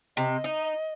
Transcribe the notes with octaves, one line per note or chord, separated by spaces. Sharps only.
C3 D#5
D#4